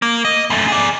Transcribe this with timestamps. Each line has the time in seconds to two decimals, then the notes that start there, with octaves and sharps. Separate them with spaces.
0.02 A#3
0.25 D#5
0.50 F#2 A3
0.68 G#4 D5